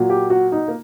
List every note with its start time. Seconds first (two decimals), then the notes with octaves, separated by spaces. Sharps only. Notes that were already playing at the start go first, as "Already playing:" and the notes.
Already playing: A#2 F#3
0.10 G4
0.30 F#4
0.52 D#4
0.68 A#3